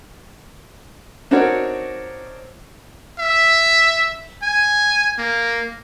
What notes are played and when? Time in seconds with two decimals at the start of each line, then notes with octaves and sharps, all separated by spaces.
1.31 C4 D4 D#4 F#4 A#4 C#5
3.19 E5
4.43 G#5
5.18 A#3